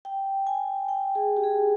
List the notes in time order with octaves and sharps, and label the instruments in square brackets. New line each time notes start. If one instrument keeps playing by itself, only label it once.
[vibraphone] G5
G#5
G5
G#4
G4
G#4